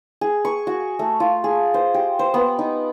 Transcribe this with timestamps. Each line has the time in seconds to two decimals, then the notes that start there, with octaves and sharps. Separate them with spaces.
0.21 G#4
0.45 C#6
0.67 F#4
0.99 A3
1.20 F4
1.44 G#4
1.74 C5
1.94 G4
2.19 C5
2.34 B3
2.59 D#4